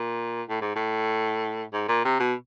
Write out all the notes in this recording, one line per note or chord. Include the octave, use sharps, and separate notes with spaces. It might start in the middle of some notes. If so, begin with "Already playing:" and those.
Already playing: A#2
A2
G#2
A2
G#2
A#2
C3
B2